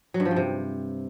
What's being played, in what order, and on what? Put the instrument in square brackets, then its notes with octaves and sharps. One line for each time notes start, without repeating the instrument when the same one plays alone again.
[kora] F#3
G2
F3
G2
C3